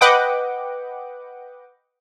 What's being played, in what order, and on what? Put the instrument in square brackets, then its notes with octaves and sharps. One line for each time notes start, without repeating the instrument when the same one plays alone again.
[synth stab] B4 D#5 F#5 G5 D6